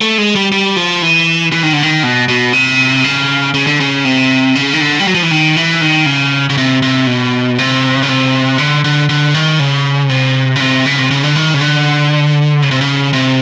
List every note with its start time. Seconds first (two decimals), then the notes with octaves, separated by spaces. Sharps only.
0.01 A3
0.18 G#3
0.35 G3
0.52 G3
0.76 F3
1.02 E3
1.52 E3
1.63 D#3
1.73 D3
1.83 D#3
2.03 B2
2.28 B2
2.53 C3
3.04 C#3
3.54 C#3
3.67 D3
3.80 C#3
4.05 C3
4.55 C#3
4.73 D#3
4.80 D3
4.99 G3
5.07 F#3
5.15 F3
5.23 E3
5.31 D#3
5.57 E3
5.81 D#3
6.06 C#3
6.50 C#3
6.58 C3
6.82 C3
7.07 B2
7.58 C3
8.03 C#3
8.08 C3
8.58 D3
8.84 D3
9.09 D3
9.34 D#3
9.60 C#3
10.09 C3
10.56 C#3
10.60 C3
10.86 C#3
10.98 C3
11.11 C#3
11.23 D3
11.36 D#3
11.54 C#3
11.61 D3
12.62 C#3
12.71 C3
12.81 C#3
13.13 C3